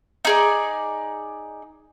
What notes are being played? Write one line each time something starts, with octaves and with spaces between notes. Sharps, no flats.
D#4 G#4 D5